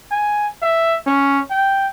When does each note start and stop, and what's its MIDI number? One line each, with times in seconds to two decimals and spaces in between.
0.12 0.48 80
0.62 0.98 76
1.07 1.41 61
1.50 1.87 79